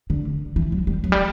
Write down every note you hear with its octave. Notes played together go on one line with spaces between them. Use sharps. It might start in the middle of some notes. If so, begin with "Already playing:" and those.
D3
E3
F#3
G3
F#3
G3